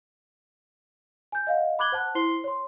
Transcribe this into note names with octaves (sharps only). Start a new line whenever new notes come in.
G#5 G6
D#5 F5 F#5
B5 D6 F#6 G#6 F#7 G7
C5 F#5 A5 F#6
E4 C5 C6 C7 G7
C#5 C6